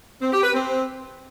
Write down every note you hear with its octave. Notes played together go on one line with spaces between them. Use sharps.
C4
G4
B4
C4